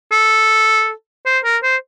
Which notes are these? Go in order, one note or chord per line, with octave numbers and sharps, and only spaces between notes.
A4
C5
A#4
C5